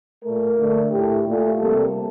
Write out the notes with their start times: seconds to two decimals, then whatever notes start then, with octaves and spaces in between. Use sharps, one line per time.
0.23 A#2 A3 A#4
0.57 D3 A3
0.90 A2 A3 G4
1.25 A#2 A3
1.59 C3 G3 A#3 A4